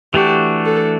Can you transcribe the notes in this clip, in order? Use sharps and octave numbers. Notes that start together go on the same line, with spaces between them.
E3 A3 D4 F#4 G4
A4